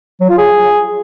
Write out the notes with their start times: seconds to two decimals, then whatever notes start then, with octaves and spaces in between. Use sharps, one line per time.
0.21 F#3
0.29 F4
0.38 G#4